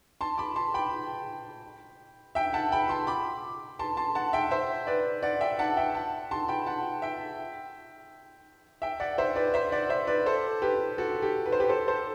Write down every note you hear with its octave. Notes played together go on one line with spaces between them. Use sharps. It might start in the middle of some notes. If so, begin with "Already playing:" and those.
A5 C6
B5 D6
A5 C6
G5 B5
E5 G5
F#5 A5
G5 B5
A5 C6
B5 D6
A5 C6
A5 C6
F#5 A5
E5 G5
C5 E5
B4 D5
D5 F#5
E5 G5
F#5 A5
E5 G5
F#5 A5
A5 C6
G5 B5
F#5 A5
E5 G5
E5 G5
D5 F#5
C5 E5
B4 D5
C5 E5
D5 F#5
C5 E5
B4 D5
A4 C5
G4 B4
F#4 A4
G4
B4
C5
G4 B4
A4 C5
A4 C5